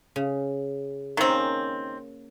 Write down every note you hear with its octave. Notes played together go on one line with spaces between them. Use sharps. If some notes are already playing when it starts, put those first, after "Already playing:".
C#3
D#3 A#3 C4 C#4